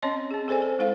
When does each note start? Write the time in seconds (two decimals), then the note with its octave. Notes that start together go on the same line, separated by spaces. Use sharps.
0.02 C4 C#4 C#5 D#5 C6
0.31 C4 G#4
0.48 G#4 A4 C5 D5 G#5
0.62 A4
0.79 G#3 E4 A4 C5 F5